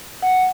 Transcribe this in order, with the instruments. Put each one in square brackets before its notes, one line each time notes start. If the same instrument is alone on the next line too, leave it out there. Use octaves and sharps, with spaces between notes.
[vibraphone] F#5